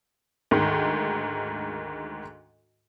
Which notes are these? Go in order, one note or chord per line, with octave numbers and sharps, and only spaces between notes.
D2 G#2 D#3